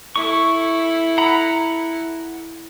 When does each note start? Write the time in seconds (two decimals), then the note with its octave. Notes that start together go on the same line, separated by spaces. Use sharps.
0.16 E4 A4 C#6
1.18 F#5 A#5 B5